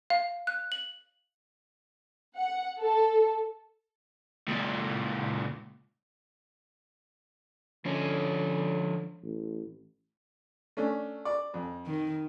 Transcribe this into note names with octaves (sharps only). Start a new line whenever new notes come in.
F5
F#6
F#7
F#5
A4
C#2 A#2
D3 F3 C#4
A1
A3 C#4 D4
D5
F2
D#3